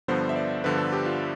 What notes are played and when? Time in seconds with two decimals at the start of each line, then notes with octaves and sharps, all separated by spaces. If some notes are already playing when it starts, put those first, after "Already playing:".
0.08 G2 D3 F3 B3 C5
0.29 E5
0.36 D5
0.64 G2 D3 F3 B3 B4
0.78 A4
0.93 G4
1.06 F4